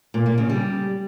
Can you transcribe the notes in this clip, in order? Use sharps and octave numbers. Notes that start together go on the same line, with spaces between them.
A#2
A#3
C#3
G3